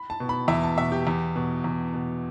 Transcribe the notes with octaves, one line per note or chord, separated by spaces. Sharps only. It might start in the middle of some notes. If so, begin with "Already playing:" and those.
Already playing: B5
A5
B2
B5
E2 E5
A5
B2 E5
G4
E2
B2
E2
B2